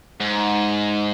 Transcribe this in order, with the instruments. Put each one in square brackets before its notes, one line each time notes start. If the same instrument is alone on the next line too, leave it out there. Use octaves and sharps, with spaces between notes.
[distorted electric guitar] G#2